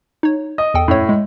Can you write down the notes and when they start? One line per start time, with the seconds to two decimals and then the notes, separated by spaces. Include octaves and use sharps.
0.23 D#4 C#5
0.58 D#5
0.74 E2 A4 G5
0.88 F#2 A2 C#5
1.09 G#3